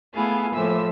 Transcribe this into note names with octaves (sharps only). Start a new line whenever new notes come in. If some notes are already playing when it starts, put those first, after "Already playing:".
A3 B3 E4 G#4 F5
A2 F3 A#3 E5 E6